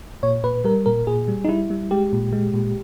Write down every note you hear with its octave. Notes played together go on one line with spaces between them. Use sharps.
A#2 C#5
A#2 B4
G3 A#4
A#2 A#4
A#2 G#4
G3
D#4
G3 E4
G3
G#3 G4
A#2
G#3
A#2